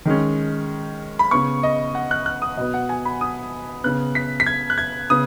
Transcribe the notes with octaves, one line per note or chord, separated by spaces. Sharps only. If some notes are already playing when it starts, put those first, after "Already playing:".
D#3 G#3 C#4
B5
C#3 B3 C#6
D#5
F#5
F#6
F#6
D#6
B2 B3 D#5
F#5
G#5
B5
D#6
C#3 B3 F#6
B6
B6
G#6
F#6
G#6
C#3 B3 D#6